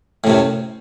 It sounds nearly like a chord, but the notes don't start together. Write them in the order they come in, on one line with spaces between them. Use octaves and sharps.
A2 C3 F#2